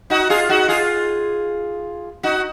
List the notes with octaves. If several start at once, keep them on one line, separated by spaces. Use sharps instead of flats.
D#4 F#4
F4 G#4
D#4 F#4
F4 G#4
D#4 F#4